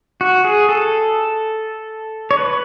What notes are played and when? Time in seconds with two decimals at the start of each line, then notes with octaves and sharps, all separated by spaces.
0.21 F#4
0.45 G#4
0.69 A4
2.31 C#5
2.37 B4